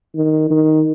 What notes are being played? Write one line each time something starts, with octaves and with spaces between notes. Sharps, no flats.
D#3
D#3